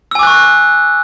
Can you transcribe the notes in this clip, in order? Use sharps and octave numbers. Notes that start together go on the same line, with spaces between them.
G#5 C#6 D6 E6 F#6